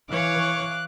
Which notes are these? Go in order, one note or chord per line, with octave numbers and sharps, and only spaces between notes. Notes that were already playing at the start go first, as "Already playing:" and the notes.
E3 C#5 F5 C#6 D6 F#6